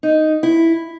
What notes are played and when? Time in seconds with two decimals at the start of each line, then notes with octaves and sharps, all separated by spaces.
0.03 D#4
0.43 E4